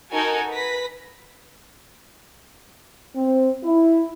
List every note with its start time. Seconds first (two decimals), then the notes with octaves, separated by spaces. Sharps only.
0.12 D#4 F#4 A4 A#4 G#5
0.51 B4 A#6 B6
3.16 C4
3.63 E4